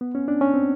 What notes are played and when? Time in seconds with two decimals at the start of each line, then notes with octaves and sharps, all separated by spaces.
0.01 B3
0.15 C#4
0.28 D4
0.41 C#4
0.54 C4